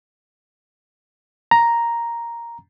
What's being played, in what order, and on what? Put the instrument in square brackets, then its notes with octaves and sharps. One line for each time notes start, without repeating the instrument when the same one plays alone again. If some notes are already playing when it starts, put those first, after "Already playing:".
[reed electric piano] A#5